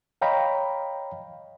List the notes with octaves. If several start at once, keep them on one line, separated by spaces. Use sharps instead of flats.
C#5 D#5 F5 G5 A#5 B5